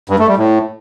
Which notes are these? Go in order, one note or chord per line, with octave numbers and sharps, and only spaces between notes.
G2
A3
G3
A2